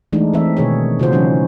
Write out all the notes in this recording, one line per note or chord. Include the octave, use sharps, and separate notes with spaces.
E3 G#3 A3 D4 D#4
E3 C4 E5
B2 D#3 G#4 C#5
C#3 F4 F#4 C5
E3 F#3 C#4 D#4